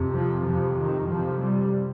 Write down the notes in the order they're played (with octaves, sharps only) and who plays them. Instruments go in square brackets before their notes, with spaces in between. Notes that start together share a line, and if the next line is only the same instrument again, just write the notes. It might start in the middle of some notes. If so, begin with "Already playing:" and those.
Already playing: [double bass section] F2 C3
F3
F2 C3 F3
D#3
F2 C3 F3
G3